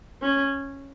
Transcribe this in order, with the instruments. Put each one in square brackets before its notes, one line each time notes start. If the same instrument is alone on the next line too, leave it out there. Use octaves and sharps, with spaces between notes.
[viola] C#4